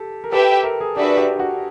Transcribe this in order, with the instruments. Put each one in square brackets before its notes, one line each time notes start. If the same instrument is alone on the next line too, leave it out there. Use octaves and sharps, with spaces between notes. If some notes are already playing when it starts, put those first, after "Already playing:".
Already playing: [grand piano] G4 A4
A#4
[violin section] G4 B4 E5 G5 [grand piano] A4
[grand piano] A#4
G#4
[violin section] D4 F#4 B4 E5 [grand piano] G4
[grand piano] G4
F#4